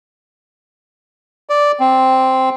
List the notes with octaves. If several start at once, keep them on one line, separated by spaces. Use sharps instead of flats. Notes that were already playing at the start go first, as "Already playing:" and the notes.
D5
C4